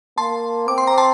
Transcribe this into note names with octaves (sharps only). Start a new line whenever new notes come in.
A#3 A5 C6
C4 D6
C6
A#5
A5 C6